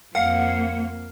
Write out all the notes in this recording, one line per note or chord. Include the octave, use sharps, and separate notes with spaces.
F2 A#3 A#4 F5 F#5